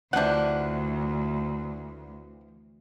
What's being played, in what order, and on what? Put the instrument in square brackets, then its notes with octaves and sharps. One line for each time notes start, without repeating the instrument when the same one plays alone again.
[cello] D2 [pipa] C3 F#5 [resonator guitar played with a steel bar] E3 F3 D4